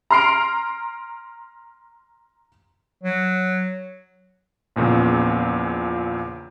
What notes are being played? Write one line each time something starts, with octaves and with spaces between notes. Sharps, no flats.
A#5 C6 F6 C7 D7 F7
F#3
A#1 E2 A#2 C#3